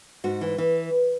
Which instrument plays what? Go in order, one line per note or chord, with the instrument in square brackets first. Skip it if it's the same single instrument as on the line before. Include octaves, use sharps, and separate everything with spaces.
[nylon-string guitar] G#2 F#4
E3
E3